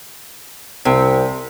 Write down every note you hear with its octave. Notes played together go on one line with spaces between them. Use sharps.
C2 C3 G5